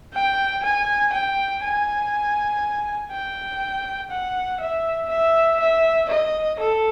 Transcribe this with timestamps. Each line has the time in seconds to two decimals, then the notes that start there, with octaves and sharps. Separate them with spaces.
0.14 G5
0.63 G#5
1.13 G5
1.63 G#5
3.12 G5
4.11 F#5
4.61 E5
5.10 E5
5.60 E5
6.10 D#5
6.59 A4